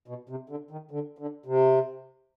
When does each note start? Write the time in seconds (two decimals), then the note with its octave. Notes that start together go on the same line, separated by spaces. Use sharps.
0.08 B2
0.29 C3
0.49 D3
0.71 D#3
0.91 D3
1.18 D3
1.46 C3